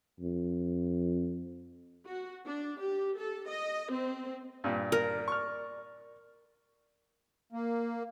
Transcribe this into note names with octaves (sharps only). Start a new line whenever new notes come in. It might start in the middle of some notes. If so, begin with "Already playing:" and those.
F2
F#4
D4
G4
A4
D#5
C4
G2 A#2 D5
A#4
C#6 F6
A#3